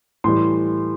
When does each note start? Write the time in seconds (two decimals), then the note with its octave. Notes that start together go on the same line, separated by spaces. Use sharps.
0.24 A2 E3 G3 C6